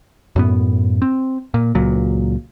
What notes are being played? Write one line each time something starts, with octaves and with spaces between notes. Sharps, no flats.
F#2 A2 B3
C4
A#2
C#2 A#2 F#3